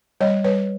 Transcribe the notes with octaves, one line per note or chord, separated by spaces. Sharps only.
G3 C#5 D#5
G3 B4 C#5